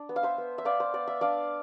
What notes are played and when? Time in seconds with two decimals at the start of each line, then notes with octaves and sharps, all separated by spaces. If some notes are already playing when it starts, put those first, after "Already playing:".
Already playing: D4
0.09 B3
0.16 F5
0.23 C5 E5
0.38 B3
0.58 E5
0.65 B3 D5 F5
0.80 C5
0.94 B3 D5
1.07 E5
1.21 D4 D5 F5